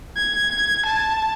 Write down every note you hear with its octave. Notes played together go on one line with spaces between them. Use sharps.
G#6
A5